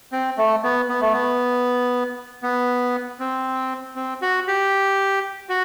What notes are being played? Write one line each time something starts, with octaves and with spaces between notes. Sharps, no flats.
C4
A3
B3
B3
A3
B3
B3
C4
C4
F#4
G4
F#4